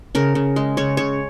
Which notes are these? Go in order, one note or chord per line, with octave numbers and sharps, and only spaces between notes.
C#3 A#4
C#3
G#3
C#3 C#5
C#3 C#5